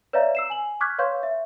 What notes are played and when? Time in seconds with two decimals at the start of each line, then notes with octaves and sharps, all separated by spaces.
0.13 B4 C#5 D5 E5 F5 A#5
0.35 E6 C7 E7
0.50 G#5 F#7
0.81 C#6 D6 F6 F#6 G#6 B6
0.98 B4 C#5 F5 C6 C#6 G6
1.23 E5